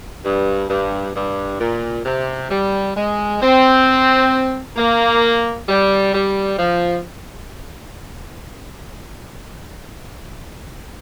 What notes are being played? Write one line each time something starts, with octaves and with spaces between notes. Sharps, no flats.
G2
G2
G2
A#2
C3
G3
G#3
C4
A#3
G3
G3
F3